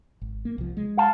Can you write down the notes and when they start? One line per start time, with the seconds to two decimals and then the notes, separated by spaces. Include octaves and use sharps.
0.21 G#1
0.45 A#3
0.58 C2 F3
0.77 G#3
0.97 F5 A5